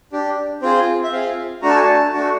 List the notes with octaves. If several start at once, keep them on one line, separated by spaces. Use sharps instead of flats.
D4 G4
C4 F4 G#4 C5
E5
C4 F4 G#4 F5
A3 D4 F#4 A#5
A5
G#5
A5
A3 D4 F#4